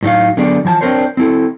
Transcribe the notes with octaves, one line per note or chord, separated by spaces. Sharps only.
A2 F#3 D#4 F5
D3 F#3 B3 G#4 D5
E3 F3 G#5 A5
C4 D4 A#4 C5 C#5
C4 E4 A4